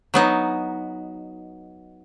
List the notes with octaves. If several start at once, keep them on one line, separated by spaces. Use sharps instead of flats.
F#3 B3 D#4